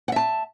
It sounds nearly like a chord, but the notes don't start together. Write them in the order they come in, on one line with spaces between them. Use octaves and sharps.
F#5 E5 A5